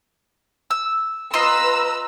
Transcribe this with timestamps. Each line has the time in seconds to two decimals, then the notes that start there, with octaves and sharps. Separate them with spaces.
0.71 E6
1.33 F4 B4 D#5 A#5 C6 E6